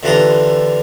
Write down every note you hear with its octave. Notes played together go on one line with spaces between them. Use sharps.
D3 E3 F4 G4 A#5